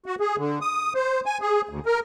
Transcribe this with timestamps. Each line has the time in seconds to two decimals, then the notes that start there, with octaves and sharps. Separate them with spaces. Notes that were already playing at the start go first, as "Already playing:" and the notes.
0.06 F#4
0.20 G#4
0.38 D3
0.61 D#6
0.95 C5
1.26 G#5
1.41 G#4
1.69 D2
1.86 A#4